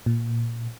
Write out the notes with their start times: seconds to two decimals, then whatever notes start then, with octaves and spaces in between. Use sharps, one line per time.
0.06 A#2